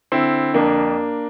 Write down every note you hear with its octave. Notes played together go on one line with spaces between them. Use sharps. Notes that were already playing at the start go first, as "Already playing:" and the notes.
D3 C4 E4
F2 A#3 D4